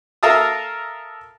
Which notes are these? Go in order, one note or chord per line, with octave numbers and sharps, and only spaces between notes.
A4 A#4 E5 F5 A5 D#6